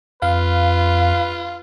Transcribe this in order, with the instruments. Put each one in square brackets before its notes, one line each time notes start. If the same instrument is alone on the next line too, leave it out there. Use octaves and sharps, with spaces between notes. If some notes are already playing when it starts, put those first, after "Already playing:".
[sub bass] F2 [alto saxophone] F4 [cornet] B4 [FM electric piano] F5